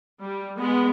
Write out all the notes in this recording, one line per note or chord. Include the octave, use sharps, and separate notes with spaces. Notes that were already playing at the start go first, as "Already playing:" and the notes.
G3
G#3 B3